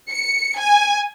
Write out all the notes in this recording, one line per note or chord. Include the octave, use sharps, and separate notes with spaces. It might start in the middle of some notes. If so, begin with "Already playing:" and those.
C#7
G#5